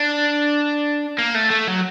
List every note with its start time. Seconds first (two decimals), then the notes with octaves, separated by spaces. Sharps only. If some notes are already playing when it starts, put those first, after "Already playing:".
Already playing: D4
1.19 A#3
1.35 A3
1.51 A3
1.68 F#3